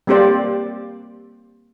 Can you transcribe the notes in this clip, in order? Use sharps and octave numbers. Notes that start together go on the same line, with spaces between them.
G3 A#3 C4 G4 C5 D5